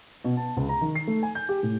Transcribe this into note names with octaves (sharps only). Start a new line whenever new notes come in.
B2
A5
C#2
A#5
D#3
C7
A3
G#5
G6
G4
A2